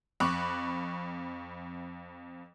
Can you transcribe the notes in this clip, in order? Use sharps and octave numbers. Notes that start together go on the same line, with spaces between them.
F2 B5 C#6 D6 F#6